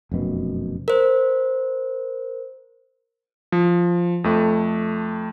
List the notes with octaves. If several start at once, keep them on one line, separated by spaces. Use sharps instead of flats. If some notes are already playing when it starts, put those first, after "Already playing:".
F1 F#2 B2
A#4 C5
F3
F2 A3